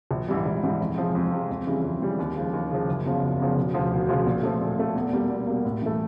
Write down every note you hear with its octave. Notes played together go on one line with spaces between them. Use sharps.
A#1
G#2 E3 G3
A#1
G#2 E3 G3
F2
C3 F3 G#3
F2
C3 F3 G#3
F2
C#3 E3 G3
F2
C#3 E3 G3
D#2
C#3 F3
D#2
C#3 F3
F#1
E2 C#3 F3
F#1
E2 C#3 F3
E1
D2 C#3 F3
E1
D2 C#3 F3
A#2
F3 A3
A#2
F3 A3
E2
B2 G3 A#3
E2
B2 G3 A#3
A2
E3 A3